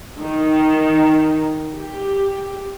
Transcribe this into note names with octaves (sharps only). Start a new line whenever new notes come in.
D#3
G4